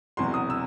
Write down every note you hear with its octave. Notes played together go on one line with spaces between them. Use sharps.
E1 E2 C3 F#3 C6
D#6
E6